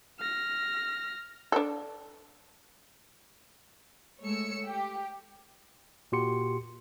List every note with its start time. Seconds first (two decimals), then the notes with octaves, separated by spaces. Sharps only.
0.19 F6 A#6
1.52 D4 A4
4.22 G#3 A3 C#5 E6 C#7
4.67 G4
6.12 A#2 F#4 G4 C6 C#7